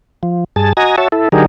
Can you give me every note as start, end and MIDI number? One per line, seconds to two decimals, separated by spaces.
0.23 0.44 53
0.56 0.73 43
0.56 0.73 68
0.56 0.73 81
0.77 0.96 66
0.77 0.96 75
0.77 0.96 80
0.77 0.96 82
0.98 1.08 66
0.98 1.08 73
0.98 1.08 76
0.98 1.08 81
1.12 1.29 64
1.12 1.29 69
1.32 1.46 50
1.32 1.46 54
1.32 1.46 63
1.32 1.46 67
1.32 1.46 68
1.32 1.46 70